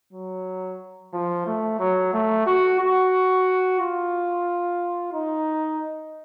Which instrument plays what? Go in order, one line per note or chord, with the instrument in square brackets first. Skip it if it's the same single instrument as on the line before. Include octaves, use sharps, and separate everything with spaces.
[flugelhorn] F#3
F3
A3
F#3
A3
F#4
F#4
F4
D#4